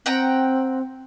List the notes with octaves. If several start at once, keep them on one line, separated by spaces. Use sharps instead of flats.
C4 F#5 G5 A#5